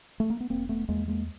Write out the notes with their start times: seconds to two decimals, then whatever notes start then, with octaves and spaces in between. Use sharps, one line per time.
0.20 A3
0.30 A#3
0.40 B3
0.50 E1 A#3 C4
0.69 A3 B3
0.89 E2 G#3 A#3
1.08 G#3 A#3